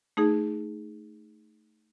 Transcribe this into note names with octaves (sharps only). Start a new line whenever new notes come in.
A3 D#4 G#4